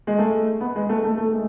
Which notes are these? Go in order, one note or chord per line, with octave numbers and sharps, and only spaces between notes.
G#3
A3
B3
G#3
A3
A3
A3
G#3